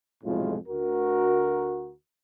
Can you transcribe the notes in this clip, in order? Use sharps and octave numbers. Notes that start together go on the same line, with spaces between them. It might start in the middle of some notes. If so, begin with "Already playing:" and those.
B1 F2 A2 C3 G#3 F4
D2 F#4 A#4